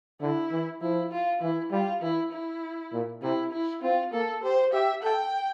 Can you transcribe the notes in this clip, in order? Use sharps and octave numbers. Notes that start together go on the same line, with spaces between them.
D3 E4
E3
F3 E4
F4
E3 E4
G3 F4
E3 E4
E4
A#2
C3 E4
E4
C4 F4
A#3 A4
G4 C5
G4 E5
A4 G5